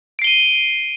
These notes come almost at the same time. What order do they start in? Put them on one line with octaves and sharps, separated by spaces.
D7 C7 G7 D#7